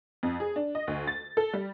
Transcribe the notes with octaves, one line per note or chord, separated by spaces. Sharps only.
F2
G#4
D4
D#5
D2
A6
A4
G3